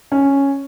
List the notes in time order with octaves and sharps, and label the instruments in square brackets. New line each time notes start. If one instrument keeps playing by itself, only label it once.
[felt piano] C#4